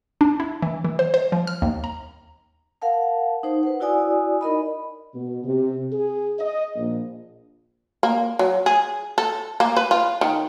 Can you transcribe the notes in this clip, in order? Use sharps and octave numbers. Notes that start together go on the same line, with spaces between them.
D4
E4
E3
E3
C5
C5
F3
F6
D#2
A#5
A#4 F5 F#5 A5
D#4 C5
B4 F#5
E4 F#4 D5 G#5 D#6
D#4 A#4 D#5 B5
B2
C3
G#4
D#5
A#1
A#3
F#3
G#4
A4
A#3
B4
F4
D#3